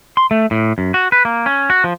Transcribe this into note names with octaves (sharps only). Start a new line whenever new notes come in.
C6
A3
A2
F#2
F#4
B4
A#3
C#4
F#4
F3